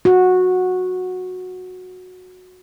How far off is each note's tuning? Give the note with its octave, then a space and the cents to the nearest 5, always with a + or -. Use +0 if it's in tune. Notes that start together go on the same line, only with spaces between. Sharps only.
F#4 -15